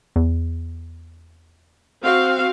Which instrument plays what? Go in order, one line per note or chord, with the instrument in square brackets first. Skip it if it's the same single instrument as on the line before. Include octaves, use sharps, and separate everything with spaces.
[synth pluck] E2
[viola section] C4 F#4 F5